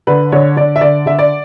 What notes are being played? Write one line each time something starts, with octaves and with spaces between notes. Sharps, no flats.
D3 B4
D3 C#5
D3 D5
E5
D3 D5
D3 E5
D5